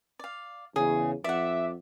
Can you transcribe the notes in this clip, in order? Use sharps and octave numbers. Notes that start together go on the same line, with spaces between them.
D5 F5
E2 C#3 G#4
F2 D5 E5 F#5